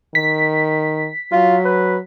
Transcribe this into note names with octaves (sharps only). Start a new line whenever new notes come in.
D#3 B6
F#3 F4
B4